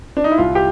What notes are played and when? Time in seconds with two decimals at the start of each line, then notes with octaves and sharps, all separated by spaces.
0.17 D4
0.24 D#4
0.32 E4
0.38 C2 F4
0.55 G4